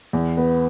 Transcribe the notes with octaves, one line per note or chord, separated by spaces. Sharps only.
E2
B3